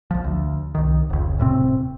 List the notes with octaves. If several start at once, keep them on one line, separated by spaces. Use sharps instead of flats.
A#1 F3
D2
C2 D#3
F1 C#2
D#1 A2 C3 C4